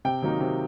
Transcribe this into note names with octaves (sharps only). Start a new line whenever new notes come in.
C3 G5
D#3 F#3 A#3 D#4
C3